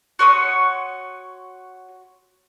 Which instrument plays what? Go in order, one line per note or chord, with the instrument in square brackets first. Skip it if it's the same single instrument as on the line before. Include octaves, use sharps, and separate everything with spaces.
[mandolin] F#4 C#5 C6 D#6